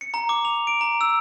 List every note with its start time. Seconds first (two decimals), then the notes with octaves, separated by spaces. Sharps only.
0.01 C#7
0.14 A#5
0.29 D6
0.45 F7
0.67 D7
0.81 A#5
1.01 E6